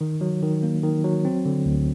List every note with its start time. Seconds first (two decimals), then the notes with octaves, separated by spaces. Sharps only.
0.01 D#3
0.21 F#3
0.42 D#3
0.63 A#3
0.83 D#3
1.04 F#3
1.25 C4
1.45 D3
1.66 D2